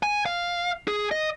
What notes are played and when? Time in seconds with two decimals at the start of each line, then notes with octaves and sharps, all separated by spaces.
0.03 G#5
0.26 F5
0.88 G#4
1.11 D#5